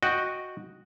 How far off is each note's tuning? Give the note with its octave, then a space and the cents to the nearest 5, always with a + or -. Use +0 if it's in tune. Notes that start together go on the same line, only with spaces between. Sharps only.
F#4 -5 D#5 +0 G5 +0